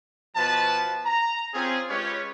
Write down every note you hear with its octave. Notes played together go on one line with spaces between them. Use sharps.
B2 F3 B4 A5
A#5
C4 C#4 F4 G#4
G#3 C#4 F4 G4 B4 C#5